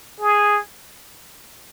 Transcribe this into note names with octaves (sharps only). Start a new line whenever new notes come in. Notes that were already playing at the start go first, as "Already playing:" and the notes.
G#4